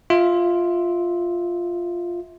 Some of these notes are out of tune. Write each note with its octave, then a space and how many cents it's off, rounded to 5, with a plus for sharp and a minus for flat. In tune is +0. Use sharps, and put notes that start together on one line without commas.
F4 +0 E5 -20